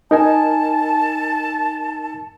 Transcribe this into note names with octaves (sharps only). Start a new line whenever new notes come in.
D#4 A#4 G#5 A5